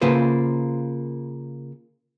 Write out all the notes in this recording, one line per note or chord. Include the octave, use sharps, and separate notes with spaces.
C#3 A#3 F4 B4 C5